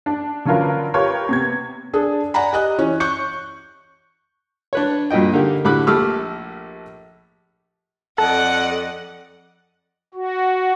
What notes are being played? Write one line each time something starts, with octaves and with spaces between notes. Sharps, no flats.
D4
D3 F#3 C#4 F4 A#4 B4
F4 G4 A#4 B4 C#5
C3 B3 G#6
D4 G#4 A4
D5 F#5 G#5 A#5 B5
G4 D#5 F#6
E3 C#4
C#6 F#6 G6 C#7
D4 B4 C#5
G2 A#2 F#4 D#5 G5
D3 A#3 D#4 G4
A2 D3 G4 B5 D6 F#6
A#1 A3 G4 D6 E6 F6
F2 A4 D5 D#5 F#5
F#4